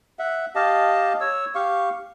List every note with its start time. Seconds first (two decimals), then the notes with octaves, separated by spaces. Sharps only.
0.19 E5 F#5
0.55 G4 D#5 F5 A5
1.21 C#5 E6
1.55 G4 F5 C#6